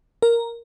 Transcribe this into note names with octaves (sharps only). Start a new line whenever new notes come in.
A#4